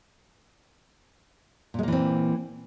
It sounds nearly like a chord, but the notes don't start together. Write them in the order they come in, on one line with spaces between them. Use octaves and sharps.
A#2 G#3 A#3 E3 C4